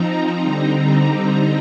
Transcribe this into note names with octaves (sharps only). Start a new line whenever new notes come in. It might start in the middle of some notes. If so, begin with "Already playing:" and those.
Already playing: F3 C4 D#4 A#5
D3 G3 C4 D#4